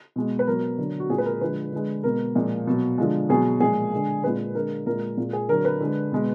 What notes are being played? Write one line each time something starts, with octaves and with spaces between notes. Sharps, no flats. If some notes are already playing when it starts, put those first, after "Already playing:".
B2 G#3
B4
B2 F#3 A#4
D3 F#3
F#4
A#2 G#3 G#4
B4
A#4
D3 F3 G#3 B4
D3 G#3
B2 G#3 A#4
A#2 F3 G#3
B2 F#3
D3 F3 G#3
B2 F#3 G#4
A#2 F3 G#3 G#4
D3 G#3
A#2 G#3 B4
D3 G#3 A#4
A#2 G#3 A#4
A#2 G#3
G#4
D3 F#3 A#4
B4
D3 G#3
B2 G#3